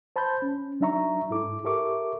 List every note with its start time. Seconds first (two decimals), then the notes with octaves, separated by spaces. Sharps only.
0.16 C5 A5 B5 C6 G6
0.42 C#4
0.80 F#3 D4 D#4 E5 A#5 C#6
1.30 G#2 E4 A4 D6
1.64 G4 A4 A#4 E5 C#6 D6